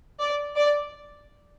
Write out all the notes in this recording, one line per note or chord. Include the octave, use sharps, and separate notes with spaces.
D5
D5